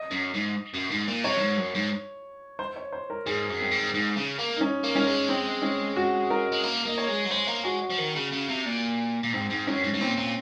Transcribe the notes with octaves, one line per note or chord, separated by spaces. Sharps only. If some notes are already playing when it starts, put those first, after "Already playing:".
Already playing: D#5
F#2
G#2
F#2
G#2
A#2
C3 C#5
F#2
G#2
F#2
G#2
C5
C#5
C5
A#4
G#2 G#4
F#2
C4
G#2
G#2
C#3
A#3
D#4
C#4
A#3
C#4
G#3
C4
C#4
F#4
A#4
G#3
A#3
A#3 D#5
C#5
G#3
F#3
G#3 C5
A#3
G#3 F#4
F3
D#3
C#3
C#3
C3
A#2
A#2
G#2 C4
G#2
F#2 C#4
G#2
G#2
A#2 C4
A#2